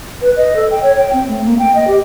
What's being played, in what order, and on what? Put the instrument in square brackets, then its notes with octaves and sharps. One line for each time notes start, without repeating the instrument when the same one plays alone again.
[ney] B4
D#5
A4
G5
C#5
G5
C4
A3
A#3
G5
D#5
G4